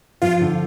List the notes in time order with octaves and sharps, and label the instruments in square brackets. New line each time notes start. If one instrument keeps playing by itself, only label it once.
[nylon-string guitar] F3 [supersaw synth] F4
[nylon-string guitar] D3